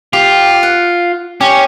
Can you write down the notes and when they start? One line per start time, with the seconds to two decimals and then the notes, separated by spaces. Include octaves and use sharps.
0.13 F4 G4
0.63 F#5
1.41 C#4 G4